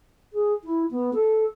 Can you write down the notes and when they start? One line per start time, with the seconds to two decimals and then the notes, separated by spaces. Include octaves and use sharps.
0.33 G#4
0.64 E4
0.91 B3
1.14 A4